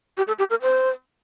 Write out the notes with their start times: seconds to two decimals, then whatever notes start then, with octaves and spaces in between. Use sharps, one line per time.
0.17 G4
0.27 A4
0.39 G4
0.50 A#4
0.62 C5